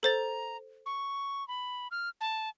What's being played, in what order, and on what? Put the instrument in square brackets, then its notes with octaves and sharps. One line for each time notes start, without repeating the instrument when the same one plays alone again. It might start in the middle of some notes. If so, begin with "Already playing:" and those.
[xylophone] A4 C5 A6 [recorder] A#5
[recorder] C#6
B5
F6
A5